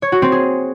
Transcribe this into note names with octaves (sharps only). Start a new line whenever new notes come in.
C#5
F#4
C4
G#4